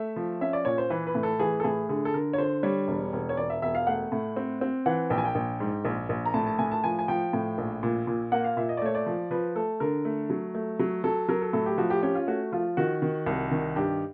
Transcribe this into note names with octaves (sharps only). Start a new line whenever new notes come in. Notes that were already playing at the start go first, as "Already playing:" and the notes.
Already playing: A3 E5
F3
C#4 E5
D5
A#2 C#5
C5
E3 B4
B4
A2
A4
E3 G#4
A4
A2 G#4
D3 G#4
A4
D3 A#4
C#5
D3 C5
G3 C#5
E1
E1
C#5
E1 D5
E5
E1 E5
F5
A3 F#5
A2
C4
C4
E3 F#5
A#1 G5
G#5
G5
A#1
G#2
A#1
A#1
A#5
A2 A5
A5
A2 G#5
A5
F3 G#5
G#5
F3 G5
A2
A#1
A#2
A#2
A#3 F#5
F5
A#2 E5
D#5
D5
A3 C#5
D5
F3
F3 B4
A3 A4
D3 A#4
A3
F#3
A3
F#3
F#3 A4
F#3 A#4
A4
A2 A4
G4
F3 F#4
G4
C#4 G4
F4
A3 F#4
F3 F4
D#3 F#4
D#3
C2
D#3
G2 G4